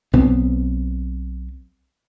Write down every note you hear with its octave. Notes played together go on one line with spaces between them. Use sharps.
B1 B3 C4